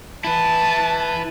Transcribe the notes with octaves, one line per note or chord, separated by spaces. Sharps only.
E4 B4 A5